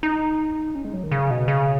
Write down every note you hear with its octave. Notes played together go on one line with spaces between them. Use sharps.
D#4
C#4
G#3
F#3
D#3
C#3
B2
C#3